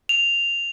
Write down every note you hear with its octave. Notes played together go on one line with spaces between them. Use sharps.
F7